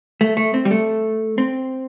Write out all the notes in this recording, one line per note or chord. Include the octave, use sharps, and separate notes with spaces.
A3
A3
C4
G3
A3
C4